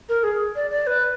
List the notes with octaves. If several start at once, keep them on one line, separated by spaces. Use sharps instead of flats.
A#4
G#4
D5
D5
B4